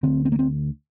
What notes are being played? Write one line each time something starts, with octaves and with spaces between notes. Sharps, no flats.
D2 D3 C4
C4
A#3
C4